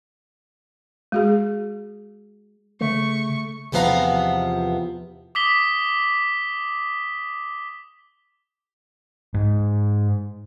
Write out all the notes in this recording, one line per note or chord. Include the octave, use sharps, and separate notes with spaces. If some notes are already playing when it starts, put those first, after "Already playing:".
G#3 F#4 G#4
C#3 A3 C#6
E2 C3 F3 B3 F5 A#5
D6 D#6 B6 G7
G#2